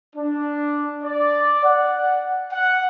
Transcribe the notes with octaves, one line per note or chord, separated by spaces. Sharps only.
D4
D5
F#5
F#5